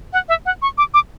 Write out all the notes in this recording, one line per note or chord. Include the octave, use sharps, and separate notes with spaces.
F#5
E5
F#5
C#6
D6
D6